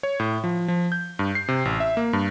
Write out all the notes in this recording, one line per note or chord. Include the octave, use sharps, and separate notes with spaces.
C#5
A2
F3
F3
G6
G2
C7
C3
A1
E5
A#3
G2